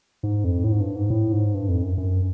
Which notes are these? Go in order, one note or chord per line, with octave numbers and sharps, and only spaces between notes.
G#2
F2
A2
G#2
G2
G#2
A2
G#2
G2
F2
F#2
F#2